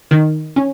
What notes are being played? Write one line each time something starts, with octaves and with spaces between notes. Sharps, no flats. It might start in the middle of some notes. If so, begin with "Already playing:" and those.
D#3
C#4